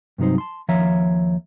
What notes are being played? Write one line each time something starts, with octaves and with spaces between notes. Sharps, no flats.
G2 C3 F#3 D#4 C5
A5 C6
D#2 F3 C#5 E5 A#5